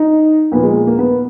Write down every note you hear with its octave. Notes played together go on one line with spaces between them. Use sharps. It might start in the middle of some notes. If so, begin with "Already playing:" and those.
Already playing: D#4
A#2 F3 B3
G#3
A#3
B3